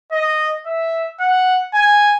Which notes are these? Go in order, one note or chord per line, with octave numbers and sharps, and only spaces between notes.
D#5
E5
F#5
G#5